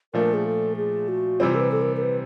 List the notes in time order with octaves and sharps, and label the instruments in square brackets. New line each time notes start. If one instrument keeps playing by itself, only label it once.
[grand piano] A#2 F3 A3 D4 [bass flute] A#4
[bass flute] G#4
A4
G#4
F#4
[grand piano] C3 E3 G3 C4 [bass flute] F4
[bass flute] A#4
B4
A4
A#4
A#4
B4